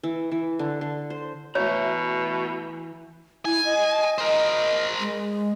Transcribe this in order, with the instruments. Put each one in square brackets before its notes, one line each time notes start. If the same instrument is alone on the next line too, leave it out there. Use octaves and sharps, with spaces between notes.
[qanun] E3
E3
D3
D3
C5
[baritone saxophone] B2 [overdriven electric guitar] E3 A#5 [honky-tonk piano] A3 E4 F#4 [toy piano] C#5
[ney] E4 [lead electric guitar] G#5
[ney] D#5
[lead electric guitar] A#4 C5
[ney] G#3